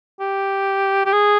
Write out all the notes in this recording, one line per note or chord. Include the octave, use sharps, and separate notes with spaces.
G4
G4
G#4